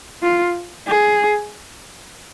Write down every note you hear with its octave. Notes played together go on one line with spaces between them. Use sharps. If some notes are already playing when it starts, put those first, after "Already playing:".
F4
G#4